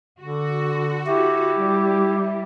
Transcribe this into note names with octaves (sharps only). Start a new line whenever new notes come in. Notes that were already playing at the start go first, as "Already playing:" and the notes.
D3 F#4
E4 G4
G3